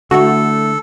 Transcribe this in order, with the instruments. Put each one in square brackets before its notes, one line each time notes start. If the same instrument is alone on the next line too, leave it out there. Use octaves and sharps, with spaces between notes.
[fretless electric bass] D3 [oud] A3 D4 E4 [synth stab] F#4 [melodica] A4